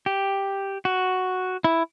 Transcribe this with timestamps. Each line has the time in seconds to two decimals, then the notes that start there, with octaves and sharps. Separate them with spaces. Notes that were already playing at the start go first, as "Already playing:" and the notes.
0.06 G4
0.85 F#4
1.64 E4